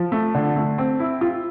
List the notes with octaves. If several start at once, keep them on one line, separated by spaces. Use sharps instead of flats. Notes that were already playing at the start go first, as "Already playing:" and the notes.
Already playing: F3
A3
D3
A3
C4
E4
F4